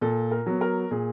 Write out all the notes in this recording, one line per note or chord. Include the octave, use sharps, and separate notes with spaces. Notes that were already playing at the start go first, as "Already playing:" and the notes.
A#2 A4
A#4
F#3 B3
A#4
A#2 G#4